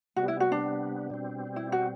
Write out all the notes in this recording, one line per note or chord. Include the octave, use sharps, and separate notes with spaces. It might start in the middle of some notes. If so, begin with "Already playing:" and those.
C3 G3 B3 F#4
E4
F#4
D4
B2 G3 C4
E4
F#4